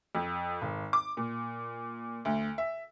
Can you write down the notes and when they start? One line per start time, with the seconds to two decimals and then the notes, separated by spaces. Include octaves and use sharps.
0.15 F2
0.62 G#1
0.93 D6
1.17 A#2
2.25 D2
2.58 E5